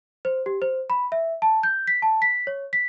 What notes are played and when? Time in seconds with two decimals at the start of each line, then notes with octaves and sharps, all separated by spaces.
0.25 C5
0.46 G4
0.62 C5
0.90 B5
1.12 E5
1.42 A5
1.63 G6
1.87 B6
2.02 A5
2.22 B6
2.47 C#5
2.73 B6